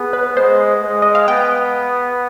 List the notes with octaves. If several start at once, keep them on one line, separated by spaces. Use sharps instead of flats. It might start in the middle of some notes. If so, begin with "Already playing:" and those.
Already playing: B3 G#4
B4
G#3 C5
G#3
D#5
F5
B3 G5